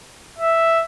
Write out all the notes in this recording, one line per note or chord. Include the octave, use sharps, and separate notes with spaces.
E5